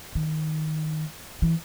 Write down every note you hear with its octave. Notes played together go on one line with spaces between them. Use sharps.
D#3
E3